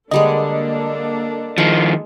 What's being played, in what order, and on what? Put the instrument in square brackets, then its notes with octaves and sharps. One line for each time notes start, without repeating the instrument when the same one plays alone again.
[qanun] D3 G3 G#3 [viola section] A#3 D4 A4 [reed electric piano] D#5
[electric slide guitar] D#3 F3 [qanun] G#3